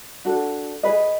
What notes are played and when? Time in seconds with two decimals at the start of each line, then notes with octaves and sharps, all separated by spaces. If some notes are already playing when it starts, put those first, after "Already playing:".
0.25 D4 F#4 A4
0.83 G#4 B4 D#5